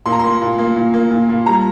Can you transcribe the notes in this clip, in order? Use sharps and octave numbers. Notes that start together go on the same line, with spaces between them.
A#2 C6
A#5
A#3 C6
A#2
A#3
A#2
A#3
A#2
A#2
G3 A#5